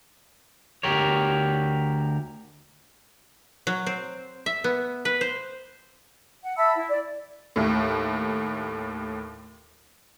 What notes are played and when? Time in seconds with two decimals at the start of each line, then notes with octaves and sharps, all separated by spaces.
0.83 D2 G4 A#4 C#5
3.67 F#3
3.87 C4
4.46 E5
4.64 B3
5.05 B4
5.21 C5
6.43 F#5
6.57 E5 A5 B5 E6
6.75 E4
6.88 D5
7.56 D#2 A2